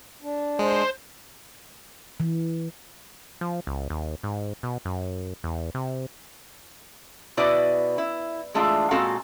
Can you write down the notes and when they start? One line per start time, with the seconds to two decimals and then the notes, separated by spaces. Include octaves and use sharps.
0.22 D4
0.59 G#3 C5
2.20 E3
3.41 F3
3.67 C#2
3.90 D#2
4.23 G#2
4.63 B2
4.85 F#2
5.44 E2
5.75 C3
7.37 B2 E4 F#4 B4 D5 D#5
7.98 E4
8.54 E3 G#3 A3 D4 F4
8.91 A#2 G#3 C4 F#4 A4 F5